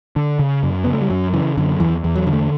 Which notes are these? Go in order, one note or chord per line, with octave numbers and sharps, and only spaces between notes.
D3
C#3
F#2
C#3 B3
A3
G3
F#2 F#3
C#3 E3
F#2 D3
E2 E3
E2
F#3
D3
A3